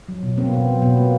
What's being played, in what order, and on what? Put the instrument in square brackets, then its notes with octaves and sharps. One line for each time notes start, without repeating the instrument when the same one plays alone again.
[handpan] F#3
B2
A#3 C4
B3
B2 C4
F#3
B2 B3
A#3